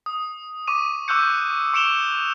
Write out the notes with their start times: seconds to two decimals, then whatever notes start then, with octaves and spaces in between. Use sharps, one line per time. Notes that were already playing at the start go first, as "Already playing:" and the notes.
0.06 D#6
0.67 C#6 D6 D#7
1.08 C#6 D6 E6 F#6 G6 C#7
1.74 C#6 C#7 D7 E7 F7 G7